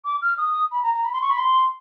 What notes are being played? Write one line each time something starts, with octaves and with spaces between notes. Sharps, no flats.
D6
F6
D#6
B5
A#5
A#5
B5
C6
C#6
B5
C6